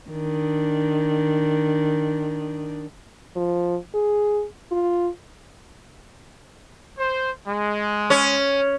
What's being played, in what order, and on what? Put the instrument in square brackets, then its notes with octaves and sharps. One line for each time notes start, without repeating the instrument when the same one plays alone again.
[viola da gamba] D#3 D4
[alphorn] F3
G#4
F4
[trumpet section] C5
G#3
[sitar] C#4